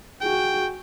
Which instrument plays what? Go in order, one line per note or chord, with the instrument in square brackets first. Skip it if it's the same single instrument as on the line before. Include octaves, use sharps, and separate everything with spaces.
[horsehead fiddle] F#4 G#4 [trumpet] G5